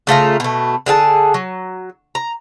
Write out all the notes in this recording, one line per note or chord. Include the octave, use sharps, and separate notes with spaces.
C#3 A3 F4 A#5
B2 A3
D3 G#4 F5 A5
F#3
A#5